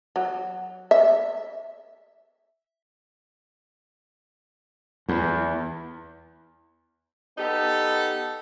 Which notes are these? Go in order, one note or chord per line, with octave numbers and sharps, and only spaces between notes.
F#3
E5
E2
B3 D#4 G4 A4